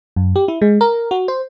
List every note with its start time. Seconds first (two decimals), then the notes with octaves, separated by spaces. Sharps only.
0.16 F#2
0.36 G4
0.48 E4
0.62 G#3
0.81 A#4
1.11 F#4
1.28 C5